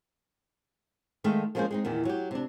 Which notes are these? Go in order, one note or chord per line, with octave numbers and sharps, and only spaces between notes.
D#3 G#3 A3 E5 F5
F3 G#3 A#3 C#4 G#4 C5
G#3 C4 D#4
E2 A#2 D#3
F#3 G4
C3 D4